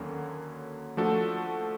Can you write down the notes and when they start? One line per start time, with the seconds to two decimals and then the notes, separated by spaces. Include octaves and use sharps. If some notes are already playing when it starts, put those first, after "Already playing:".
Already playing: D#2 D3 F#3 A#3 C#4
0.97 F3 A3 D4 F#4 A4